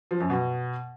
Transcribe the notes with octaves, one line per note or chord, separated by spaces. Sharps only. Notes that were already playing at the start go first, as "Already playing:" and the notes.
F3
F#2
B2